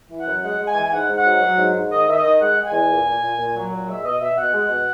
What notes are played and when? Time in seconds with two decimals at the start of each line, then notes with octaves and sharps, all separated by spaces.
0.10 E3
0.18 F#5
0.27 F#2
0.43 G#3 F#5
0.59 G#3
0.67 G#5
0.75 E3
0.83 G#5
0.92 G#2 F#5
1.09 G#2
1.17 F#5
1.25 F#3
1.41 F#3
1.58 G#2
1.74 G#2
1.90 D#3 D#5
2.07 D#3 E5
2.15 D#5
2.23 D#3
2.40 G#3 F#5
2.57 G#3
2.64 G#5
2.72 E2
2.90 A#2
3.05 A#2
3.22 A#2
3.38 A#2
3.55 F#3
3.71 A#2
3.88 G#3 E5
4.04 B2 D#5
4.21 B2 E5
4.37 B2 F#5
4.53 G#3
4.69 B2